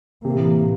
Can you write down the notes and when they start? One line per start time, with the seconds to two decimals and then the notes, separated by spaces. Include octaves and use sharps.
0.25 A2 C3 E3 A#3